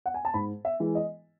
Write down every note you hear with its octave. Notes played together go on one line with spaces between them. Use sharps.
F#5
G#5
A5
G#2 B5
E5
E3 G#3
D#5